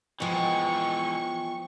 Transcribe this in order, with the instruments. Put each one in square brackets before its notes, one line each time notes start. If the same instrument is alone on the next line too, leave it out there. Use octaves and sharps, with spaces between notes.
[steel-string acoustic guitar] B2 F3 [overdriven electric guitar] E3 G#3 [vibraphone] G5 G#5 [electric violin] C#6